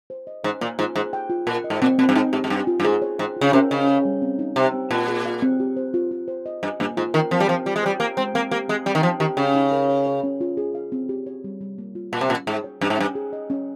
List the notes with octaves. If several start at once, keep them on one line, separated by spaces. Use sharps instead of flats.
C5
D#5
G#2 C#5
A#2 A#3
G#2 F4
G#2 G#4
G5
F4
A#2 A#4
D#5
G#2
A#2 C4
A#2 C4
G2
G#2 D#4
G#2 G4
G#2
G2 G5
F4
G2
G#2 G#4
C#5
G#2 G5
C#3 F4
C3 A#4
C#3 D#5
G#4
G3
C4
D#4
C3 C5
C4
A#2 F4
G#4
F5
C4
G4
C5
F4
F4
C5
D#5
G2 D#5
G2 A#3
G#2 F4
D#3 A#4
F3 C4
G3
F3 C4
G3 F4
G#3
G3 C5
A#3 C5
G#3 C4
A#3 C4
A#3 G4
G#3 C4
G3 C4
D#3
F3 D#4
D#3 G4
C#3 G5
D#4
A#4
C#5
C#5
C#4
F4
G#4
F5
C4
G4
C#5
G3
G3
A#3
F4
A#2 F5
C3
A#2 C#4
G#2 G#4
C#5
G2 C#4
G#2
G2 C#4
G#4
D#5
C#4